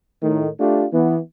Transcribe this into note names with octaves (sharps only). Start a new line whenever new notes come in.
A2 D#3
A3 D4 F4 G4
E3 B3